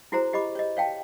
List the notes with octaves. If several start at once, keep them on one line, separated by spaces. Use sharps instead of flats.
E4 F#4 G#4 C5 A#5
G4 D#5 B5 D6
C#5 D#5
C#5 F5 G5 A5